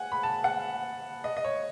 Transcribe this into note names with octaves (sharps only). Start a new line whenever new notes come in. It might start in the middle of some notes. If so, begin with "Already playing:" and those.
Already playing: F#5 G#5
B5
A5
F#5
D#5
D#5
C#5